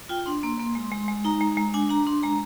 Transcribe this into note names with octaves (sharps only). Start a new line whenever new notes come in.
F4 G5
D4 C6
A#3
A#3
G#3
G#3
G#3
D#4 A#5
G#3
G#3
D4 G#5
D4 A#5
D4 C6
G#3 A#5